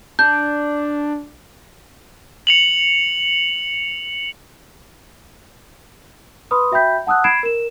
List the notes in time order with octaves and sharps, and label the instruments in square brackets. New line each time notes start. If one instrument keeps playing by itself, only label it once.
[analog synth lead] D4 [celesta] G6
[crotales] C#7 F7 F#7
[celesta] B4 B5 C6 D#6
F#4 E5 G5 B5 G6 B6
F#5 A5 D#6 E6 F#6
B5 G#6 C7 D7 E7
A#4 E7